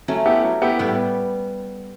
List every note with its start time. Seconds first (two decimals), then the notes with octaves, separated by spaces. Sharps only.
0.08 F#3 A3 C#4
0.26 B3 E4 G4
0.44 F#3
0.62 B3 E4 G4
0.79 A2 G3 B3